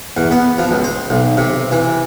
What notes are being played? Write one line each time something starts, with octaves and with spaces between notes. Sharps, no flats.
E2
B3
F3
C#2
C5
B1
C3
E3